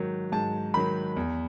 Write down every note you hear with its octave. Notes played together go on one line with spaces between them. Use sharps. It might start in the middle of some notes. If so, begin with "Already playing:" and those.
Already playing: G#2 D#3 F#3
G#2 A5
D#3 F#3 B5
E2